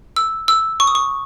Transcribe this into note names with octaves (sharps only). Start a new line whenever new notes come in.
E6
E6
C#6
D#6
C#6